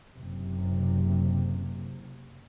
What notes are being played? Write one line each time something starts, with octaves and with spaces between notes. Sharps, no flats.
F#1 C3